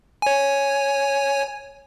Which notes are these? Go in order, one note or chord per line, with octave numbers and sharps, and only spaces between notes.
C#5 G#5